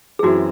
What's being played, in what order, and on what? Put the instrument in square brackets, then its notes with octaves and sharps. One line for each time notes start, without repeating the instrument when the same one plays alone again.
[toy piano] G#4
[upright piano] F#2 E3 C4 E4 [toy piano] F#4